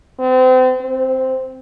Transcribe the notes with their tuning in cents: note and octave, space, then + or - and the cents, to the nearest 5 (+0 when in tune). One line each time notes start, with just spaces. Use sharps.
C4 -35
C4 -5